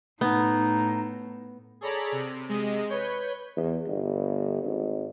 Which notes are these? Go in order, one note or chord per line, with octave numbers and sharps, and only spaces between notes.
A2 B3 D#4
G#4 A4 C#5 D5 A#5 B5
C3
C3 G#3 D#5
B4 C#5 G6
E2
G1
G#1